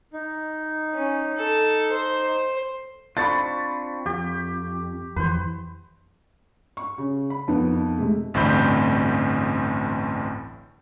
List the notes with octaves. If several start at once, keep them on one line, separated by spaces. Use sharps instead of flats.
D#4
C#4
A4
C5
C4 D4 F4 B5 C#6 A6
F2 G4
F2 E3 B4 C5
C#6
C#3
B5
F2 D#3 B3
C3 G#3 A3
A1 D2 G2 C4 B5 G6